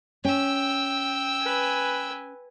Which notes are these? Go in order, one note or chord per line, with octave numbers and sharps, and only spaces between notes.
C#4 G5 E6
B4 G#5